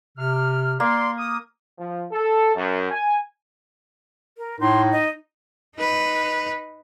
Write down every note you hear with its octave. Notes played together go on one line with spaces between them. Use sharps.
C3 F6
A#3 D5 C6
D#6
F3
A4
F#2
G#5
A#4
A2 D#4 C6
D#5
D#4 B4